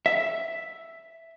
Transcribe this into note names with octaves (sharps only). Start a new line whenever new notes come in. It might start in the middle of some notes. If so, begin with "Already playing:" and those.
E5